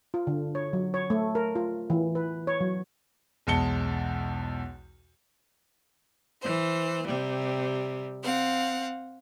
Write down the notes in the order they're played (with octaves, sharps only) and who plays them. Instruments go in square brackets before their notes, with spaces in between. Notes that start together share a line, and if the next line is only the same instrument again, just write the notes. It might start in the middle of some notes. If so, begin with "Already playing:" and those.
[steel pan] F4
D3
C#5
F#3
C#5
A3
A#4
F4
E3
B4
C#5
F#3
[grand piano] B1 E2 G#3 A5 C#7 G7
[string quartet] E3 C5
C3 G3
C4 F5 F#5